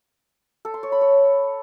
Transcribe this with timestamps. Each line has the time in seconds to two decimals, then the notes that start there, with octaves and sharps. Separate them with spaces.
0.65 A4
0.74 C6
0.83 C#5
0.92 B5
1.01 C#5